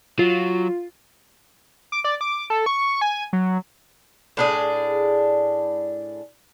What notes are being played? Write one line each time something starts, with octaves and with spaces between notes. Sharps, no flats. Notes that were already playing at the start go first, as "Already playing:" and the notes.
F#3 F4
D6
D5
D6
A4
C#6
G#5
F#3
A2 D4 G#4